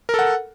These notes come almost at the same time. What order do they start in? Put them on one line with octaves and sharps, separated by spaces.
A#4 A4 F#5